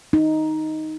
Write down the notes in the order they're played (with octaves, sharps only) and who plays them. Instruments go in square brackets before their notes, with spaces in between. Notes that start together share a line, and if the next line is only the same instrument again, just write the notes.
[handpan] D#4